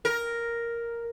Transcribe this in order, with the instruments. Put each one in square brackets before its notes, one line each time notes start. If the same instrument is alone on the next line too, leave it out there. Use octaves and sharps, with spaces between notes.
[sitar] A#4